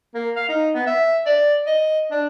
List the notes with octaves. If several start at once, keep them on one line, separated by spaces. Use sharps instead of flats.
A#3
F5
D#4
B3
E5
D5
D#5
D4